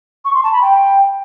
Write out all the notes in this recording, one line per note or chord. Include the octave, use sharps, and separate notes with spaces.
C#6
C6
A5
B5
G5